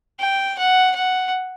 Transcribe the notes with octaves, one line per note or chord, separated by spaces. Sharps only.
G5
F#5
F#5